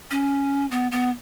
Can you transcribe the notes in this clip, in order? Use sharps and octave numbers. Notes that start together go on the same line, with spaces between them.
C#4
B3
B3